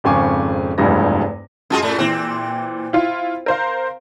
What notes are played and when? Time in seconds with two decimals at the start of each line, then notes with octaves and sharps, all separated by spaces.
0.04 G#1 F2 C#3 G#5 C#6 D6
0.78 F1 E2 G2 F3 G#3 A#6
1.70 F#2 G#3 F4 F#4 A5
1.82 A2 A3
1.98 A#2 E3 C4
2.93 E4 F4
3.46 A#4 C5 F5